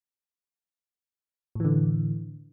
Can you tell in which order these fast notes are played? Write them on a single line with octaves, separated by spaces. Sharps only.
A2 E3 D3